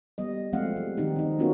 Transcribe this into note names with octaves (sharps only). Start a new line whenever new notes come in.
G3 B3 D#5
F3 G#3 A3 C4 F5 F#5
G3
D#3 C4 D#4 G4
C4 D#4
A#3 B3 C#4 F4 F#4 A#4